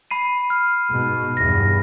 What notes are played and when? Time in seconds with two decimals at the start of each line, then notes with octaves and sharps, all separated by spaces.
0.11 B5 C7 D#7
0.50 F6
0.89 G#2 B2
1.37 E2 G2 A#6